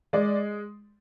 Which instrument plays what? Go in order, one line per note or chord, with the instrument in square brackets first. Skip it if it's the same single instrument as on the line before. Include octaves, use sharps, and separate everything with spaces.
[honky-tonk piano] G#3 D5